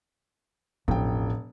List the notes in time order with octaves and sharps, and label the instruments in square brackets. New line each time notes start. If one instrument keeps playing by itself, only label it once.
[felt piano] E1 F3 G5 [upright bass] A1